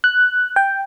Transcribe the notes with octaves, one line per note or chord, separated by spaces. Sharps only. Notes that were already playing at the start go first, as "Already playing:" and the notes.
F#6
G5